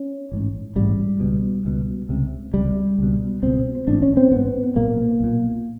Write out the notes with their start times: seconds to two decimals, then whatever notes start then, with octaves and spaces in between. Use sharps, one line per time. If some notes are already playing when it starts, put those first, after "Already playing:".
Already playing: C#4
0.32 A1 G#2
0.76 A1 G#2 G3
1.20 C#2 B2
1.65 C#2 B2
2.09 C#2 C3
2.54 C#2 C3 G3
2.98 C#2 B2
3.42 C#2 B2 C4
3.87 A1 G#2 D4
4.02 C#4
4.17 C4
4.32 A1 G#2 B3
4.76 B1 A#2 A#3
5.20 B1 A#2